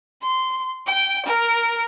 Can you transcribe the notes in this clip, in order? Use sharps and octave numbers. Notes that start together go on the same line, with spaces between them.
C6
G5
A#4